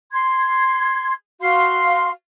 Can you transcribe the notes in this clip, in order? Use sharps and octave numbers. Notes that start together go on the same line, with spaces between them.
C6 G#6
F#4 F5 C6